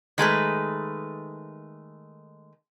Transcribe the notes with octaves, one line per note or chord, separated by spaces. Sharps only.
D#3 G#3 A3 B4